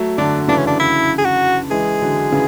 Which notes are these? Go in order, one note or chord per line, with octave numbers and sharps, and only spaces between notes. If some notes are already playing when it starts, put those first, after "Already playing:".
Already playing: F#3 A3
D3 F#3 D4
C#3 E3 D4
C#4
D4
E4
G#4
F#4
E3 G#3 G#4
D3 F#3
C#3 E3